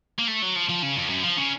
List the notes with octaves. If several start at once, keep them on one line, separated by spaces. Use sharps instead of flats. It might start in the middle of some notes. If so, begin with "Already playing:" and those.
A#3
A3
F#3
F3
F3
C#3
F2
F#2
F3
C#3